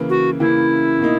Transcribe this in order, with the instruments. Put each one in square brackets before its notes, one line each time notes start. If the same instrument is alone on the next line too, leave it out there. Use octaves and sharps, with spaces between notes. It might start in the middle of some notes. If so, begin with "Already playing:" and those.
Already playing: [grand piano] C#3 E3 A#3
[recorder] F#4
[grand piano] C#3 E3 A#3 [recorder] E4
[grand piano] B2 A#3 D#4